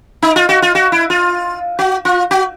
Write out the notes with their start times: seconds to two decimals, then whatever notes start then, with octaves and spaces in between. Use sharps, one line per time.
0.22 D#4
0.36 F4
0.49 F#4
0.62 F4
0.75 F#4
0.92 E4
1.10 F4
1.79 F#4
2.05 F4
2.31 F#4